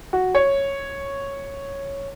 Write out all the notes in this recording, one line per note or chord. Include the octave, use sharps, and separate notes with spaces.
F#4
C#5